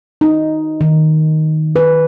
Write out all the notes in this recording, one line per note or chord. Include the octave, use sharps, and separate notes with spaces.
D#4
D#3
B4